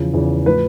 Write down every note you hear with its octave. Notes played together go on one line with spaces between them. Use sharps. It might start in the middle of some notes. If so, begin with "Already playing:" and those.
Already playing: E2 C#3 F3
E2 C#3 F3
A2 F3 B4